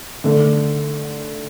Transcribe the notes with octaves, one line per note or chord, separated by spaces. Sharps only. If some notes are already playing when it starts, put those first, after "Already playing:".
D3 A3 D4